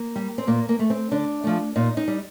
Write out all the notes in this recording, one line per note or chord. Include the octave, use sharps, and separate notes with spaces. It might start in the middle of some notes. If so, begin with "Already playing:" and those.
Already playing: A#3
G3
C4
A#2 A#3
A#3
A3
C4
D3 D4
F3 A3
A#2 D#4
D#4
G3